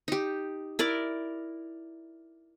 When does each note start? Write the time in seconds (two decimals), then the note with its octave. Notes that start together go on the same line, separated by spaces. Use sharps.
0.08 D#4 G4
0.79 E4 A#4 D5